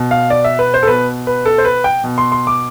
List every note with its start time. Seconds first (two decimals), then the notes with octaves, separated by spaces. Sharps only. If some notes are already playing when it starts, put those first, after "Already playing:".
Already playing: B2
0.11 F5
0.30 D5
0.44 E5
0.59 B4
0.74 C5
0.83 A4
0.87 B2 B4
1.27 B4
1.46 A4
1.58 C5
1.65 B4
1.84 G5
2.04 B2
2.18 C6
2.32 C6
2.47 D6